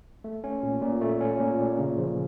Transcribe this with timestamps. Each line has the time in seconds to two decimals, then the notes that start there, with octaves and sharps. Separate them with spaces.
0.24 A3
0.44 C#4
0.63 A#2
0.82 A#2
1.01 A3
1.21 C#4
1.40 A#2
1.59 A#2
1.78 C#3
1.98 F3